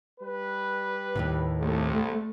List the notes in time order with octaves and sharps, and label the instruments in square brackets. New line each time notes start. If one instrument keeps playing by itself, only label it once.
[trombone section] G3 B4
[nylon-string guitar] D#2 A2 C3
[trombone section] C2 [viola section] A3